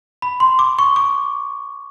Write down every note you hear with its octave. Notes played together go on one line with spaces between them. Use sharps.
B5
C6
D6
C#6
D6